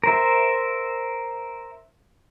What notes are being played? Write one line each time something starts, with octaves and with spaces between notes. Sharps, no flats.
A#4 C5 E5